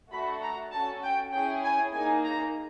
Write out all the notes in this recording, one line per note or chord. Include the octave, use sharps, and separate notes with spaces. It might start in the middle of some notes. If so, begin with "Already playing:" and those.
A3 D4 F#4 A4 B5
A#5
C#4 F#4 A4 A5
G5
C#4 E4 G#4 G5
G#5
A#3 D#4 G#4 G#5
A#5